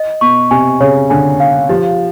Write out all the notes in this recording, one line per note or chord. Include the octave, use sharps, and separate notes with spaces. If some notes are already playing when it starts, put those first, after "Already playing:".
Already playing: D#5
B2 C#6
C3 G#5
C#3 C#5
D3 G#5
F5
F3 G4